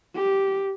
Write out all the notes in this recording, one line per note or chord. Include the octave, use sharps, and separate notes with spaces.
G4